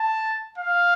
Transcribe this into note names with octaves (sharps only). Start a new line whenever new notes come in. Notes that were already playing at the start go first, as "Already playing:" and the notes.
Already playing: A5
F5